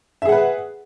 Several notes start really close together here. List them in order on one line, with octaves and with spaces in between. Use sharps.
E5 G#4 F#5 B4